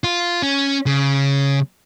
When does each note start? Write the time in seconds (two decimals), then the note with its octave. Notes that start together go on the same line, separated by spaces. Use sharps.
0.04 F4
0.42 C#4
0.86 C#3